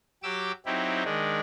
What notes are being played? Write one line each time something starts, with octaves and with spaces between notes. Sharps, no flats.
F#3 G4 D6 E6
F#3 C4 D#4 E4 G4
D#3 G#3 D4